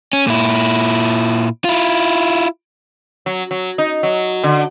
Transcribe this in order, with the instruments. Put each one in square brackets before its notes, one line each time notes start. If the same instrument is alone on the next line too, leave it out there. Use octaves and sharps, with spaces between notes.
[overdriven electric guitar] C#4
A#2 E4
E4 F4
[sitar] F#3
F#3
D#4
F#3
D3